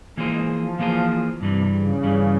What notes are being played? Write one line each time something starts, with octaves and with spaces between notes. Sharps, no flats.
E3 G#3 A#3 F4 G#4 C5
F3
E3 A#3 F4 G#4 C5
G2 C3 E3 G3
C#3
G2 E3 G3